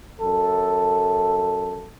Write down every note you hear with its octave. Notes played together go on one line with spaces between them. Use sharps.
F#2 A4